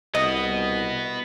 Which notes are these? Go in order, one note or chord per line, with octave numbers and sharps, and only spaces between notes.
C2 B3 F#4 D#5